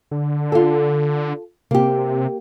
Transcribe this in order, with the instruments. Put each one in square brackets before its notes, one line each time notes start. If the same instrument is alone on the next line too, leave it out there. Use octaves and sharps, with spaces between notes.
[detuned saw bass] D3
[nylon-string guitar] F4 A4
[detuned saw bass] C3 [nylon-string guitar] A#3 G4